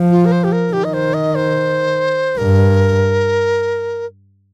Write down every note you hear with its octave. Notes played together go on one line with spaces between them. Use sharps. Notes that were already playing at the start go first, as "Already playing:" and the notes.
Already playing: F3
F4
A#4
C5
G4
A#4
D#3 G4
D#5
C5
D#5
C5
G2 A#4